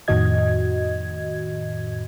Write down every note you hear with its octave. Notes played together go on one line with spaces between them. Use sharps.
F2 A2 D#3 F#4 D#5 G#6